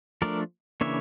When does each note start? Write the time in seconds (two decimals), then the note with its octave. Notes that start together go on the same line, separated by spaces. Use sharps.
0.22 F3 A3 D4 A#4 D5
0.81 C#3 E3 A#3 D4 C#5 E5